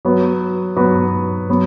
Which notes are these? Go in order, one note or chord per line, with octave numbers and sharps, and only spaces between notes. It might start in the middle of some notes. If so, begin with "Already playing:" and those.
F#3 B3 F#4 B4
F#3 B3 F#4 B4
F#3 B3